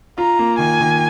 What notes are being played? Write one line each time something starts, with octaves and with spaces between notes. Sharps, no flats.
F4 A#5
A#3
D#3 G#5
D#3